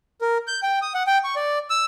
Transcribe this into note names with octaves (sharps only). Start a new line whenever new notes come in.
A#4
G6
G5
D#6
F#5
G5
C#6
D5
E6